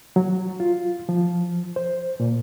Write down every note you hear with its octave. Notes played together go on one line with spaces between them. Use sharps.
F#3
F4
F3
C5
A#2